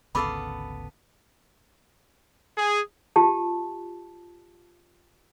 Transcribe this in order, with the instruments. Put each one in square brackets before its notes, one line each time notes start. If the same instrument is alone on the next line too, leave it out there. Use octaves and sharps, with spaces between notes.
[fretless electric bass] G#1 D2 C#3 [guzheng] B3 A4 F5 [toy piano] B5 D6
[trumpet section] G#4
[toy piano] F4 G4 A5